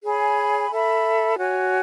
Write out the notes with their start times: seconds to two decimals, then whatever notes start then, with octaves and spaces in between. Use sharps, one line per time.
0.04 G#4 C#5 G#5 B5
0.70 A4 E5 B5
1.36 F#4 C#5 G#5